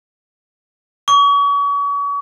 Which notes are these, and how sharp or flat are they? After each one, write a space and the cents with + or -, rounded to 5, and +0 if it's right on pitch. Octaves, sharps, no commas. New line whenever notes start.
C#6 +40